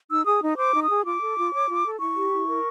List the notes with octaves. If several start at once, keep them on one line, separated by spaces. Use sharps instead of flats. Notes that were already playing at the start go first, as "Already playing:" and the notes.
D#4 E6
G#4 D#6
D#4
C5 D6
D#4
D#6
G#4
F4 D6
A4
F4
C#5
F4
A4
E4 C#6
G4
E4
A#4